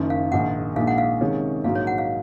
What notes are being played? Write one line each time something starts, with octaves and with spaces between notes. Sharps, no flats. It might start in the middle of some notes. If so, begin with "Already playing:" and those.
Already playing: F#1 F#2 D#3
F5
A#1 G#2 D#3 G#3 F#5
A#1 A#2 G#3 D#4 F5
F#5
F5
C3 D#3 G#3 C#4
A#1 G#2 F#3 A#3 D#4 F5
C#5
F#5
F5